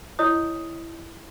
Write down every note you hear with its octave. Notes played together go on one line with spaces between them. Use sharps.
E4 C#5 D#5 D#6